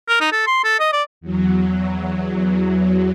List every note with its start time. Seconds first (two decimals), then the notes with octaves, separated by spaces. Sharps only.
0.08 A#4
0.21 D#4
0.32 A4
0.47 C6
0.64 A4
0.80 D#5
0.93 D5
1.21 E2 F#3